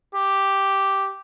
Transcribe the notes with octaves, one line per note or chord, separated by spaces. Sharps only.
G4